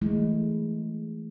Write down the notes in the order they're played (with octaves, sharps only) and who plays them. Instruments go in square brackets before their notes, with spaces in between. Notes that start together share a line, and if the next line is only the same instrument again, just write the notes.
[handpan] E3 F#3 G#3 A3 E4